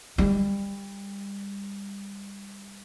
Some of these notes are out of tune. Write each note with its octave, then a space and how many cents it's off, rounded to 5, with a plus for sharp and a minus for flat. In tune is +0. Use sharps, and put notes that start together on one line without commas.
G3 +25